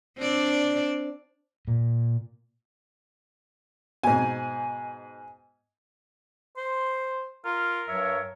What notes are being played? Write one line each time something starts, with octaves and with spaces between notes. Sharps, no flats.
C4 D4 D5
A#2
G#2 B2 G#5
C5 C6
F4 A#4
G2 F#3 C#5 E5